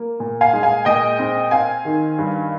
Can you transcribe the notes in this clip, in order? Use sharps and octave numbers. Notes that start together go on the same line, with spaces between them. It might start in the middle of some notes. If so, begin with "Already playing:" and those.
Already playing: A#3
A#2
F5 G#5
G#3
F5 G#5
A#2 D#5 G5
C4
C4 F5 G#5
D#3
G2